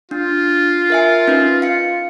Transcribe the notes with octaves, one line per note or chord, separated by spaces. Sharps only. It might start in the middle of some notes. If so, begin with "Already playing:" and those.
D4 F4
A#4 E5 G#5
C#4 D#4 B4
F5 C#7